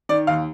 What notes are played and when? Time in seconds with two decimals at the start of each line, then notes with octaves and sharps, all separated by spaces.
0.09 D#3 D5
0.27 D#2 F5